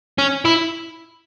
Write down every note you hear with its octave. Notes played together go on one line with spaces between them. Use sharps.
C#4
E4